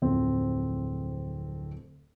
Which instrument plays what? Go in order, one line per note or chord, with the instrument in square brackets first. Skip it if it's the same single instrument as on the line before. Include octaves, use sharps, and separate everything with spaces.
[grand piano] D1 F2 C4